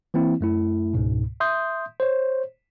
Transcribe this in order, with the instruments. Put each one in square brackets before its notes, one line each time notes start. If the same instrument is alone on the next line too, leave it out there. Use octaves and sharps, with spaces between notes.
[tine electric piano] E3 A#3 C4 E4
F#2 A3 E4
C#2 G#2 B2
E5 C6 D#6 G6
C5 C#5